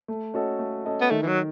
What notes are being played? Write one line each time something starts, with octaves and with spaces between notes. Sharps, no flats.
A3
C#4 F#4 A4 D#5
A3
C#4 F#4 A4 D#5
B3
D#3 A3
E3
F#3